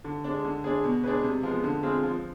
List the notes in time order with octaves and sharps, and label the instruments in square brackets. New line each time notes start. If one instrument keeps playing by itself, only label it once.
[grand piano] D3
G#3 D4
D3
G#3 D4 G#4
B2
G#3 D4 G#4 B4
C3
F3 G#3 B3
D3
G#3 C4 F4 G#4
F3